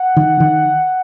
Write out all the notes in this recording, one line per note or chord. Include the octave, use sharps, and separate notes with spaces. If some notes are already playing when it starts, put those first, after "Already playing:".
Already playing: F#5
D#3
D#3